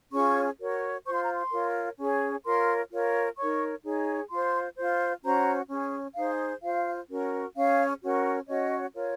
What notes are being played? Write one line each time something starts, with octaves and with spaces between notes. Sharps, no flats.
C#4 F4 G#4 C#5 C#6
F#4 A#4 C#5
F4 C5 C#6
C6
A#5
C6
F4 A#4 C#5
C#4 G#4 C#5
F4 A#4 C#5 C6
F4 A#4 C#5
D#4 A#4 C#5 C#6
D#4 G#4 C#5
F4 C5 C6
F4 C5
C#4 F#4 C5 A#5
C#4 G#4 C#5
D#4 G#4 C5 F5
F4 C5 F5
C#4 F#4 A#4
C#4 G#4 C#5 F5
C#4 F#4 A#4
C#4 F#4 C#5 D#5
F4 A#4 C#5